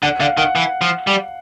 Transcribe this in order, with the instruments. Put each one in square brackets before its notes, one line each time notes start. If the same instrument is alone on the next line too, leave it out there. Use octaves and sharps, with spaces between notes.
[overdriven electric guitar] D3 [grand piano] F#5
[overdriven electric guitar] D3 [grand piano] F5
[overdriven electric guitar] D#3 [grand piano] F#5
[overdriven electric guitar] E3
F3
G3